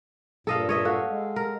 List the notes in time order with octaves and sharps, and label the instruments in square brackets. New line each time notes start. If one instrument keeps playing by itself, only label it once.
[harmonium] G2 A#2 [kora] A4 D#5 F5
[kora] C#5 D#5 E5
[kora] F#4 [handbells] A4 F5
[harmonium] G#3
[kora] A#4